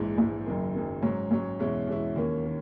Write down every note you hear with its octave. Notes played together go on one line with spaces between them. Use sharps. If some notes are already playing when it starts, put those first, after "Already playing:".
Already playing: A#1 G#2 E3 G#3
A#1 G#2 E3 G#3
F#1 F#2 D#3
F#1 F#2 D#3
G#2 F#3 C#4
G#2 F#3 C#4
E2 B2 G#3 C#4 E4
E2 B2 G#3 C#4 E4
D#2 D#3 A#3 C#4
D#3